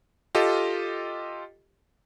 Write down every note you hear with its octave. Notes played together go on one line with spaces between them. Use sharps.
F4 G4 A4 D#5